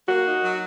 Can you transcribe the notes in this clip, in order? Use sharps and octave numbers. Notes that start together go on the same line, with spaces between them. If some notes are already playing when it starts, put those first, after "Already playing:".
A#3 F#4
D#4
F#3